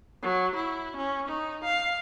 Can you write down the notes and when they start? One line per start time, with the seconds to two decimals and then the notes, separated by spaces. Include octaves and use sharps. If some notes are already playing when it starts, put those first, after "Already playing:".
0.23 F#3
0.55 E4
0.97 C#4
1.29 D#4
1.64 F5